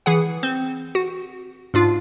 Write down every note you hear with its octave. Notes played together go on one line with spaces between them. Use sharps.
E3 G#4 F#5
C4
F#4
G#2 D4 F4